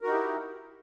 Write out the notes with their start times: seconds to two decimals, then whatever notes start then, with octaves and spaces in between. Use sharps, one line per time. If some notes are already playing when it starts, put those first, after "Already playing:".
0.01 A#4
0.04 F#4
0.07 D#4
0.10 G4
0.13 E4